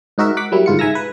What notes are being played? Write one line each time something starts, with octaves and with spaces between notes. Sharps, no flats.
G#2 D#4 F#4 A#4 E5
F#5 D6 B6
F#3 G3 A#3 E4
G1 G#2 F4 C#7
G#2 E5 G#5 A#5 E6 A#6
B4